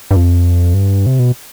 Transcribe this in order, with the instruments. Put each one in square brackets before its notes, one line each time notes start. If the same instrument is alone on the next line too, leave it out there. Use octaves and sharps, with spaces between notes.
[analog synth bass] G2
F2
G2
C3
B2